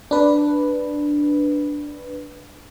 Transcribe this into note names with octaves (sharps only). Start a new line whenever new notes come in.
D4 B4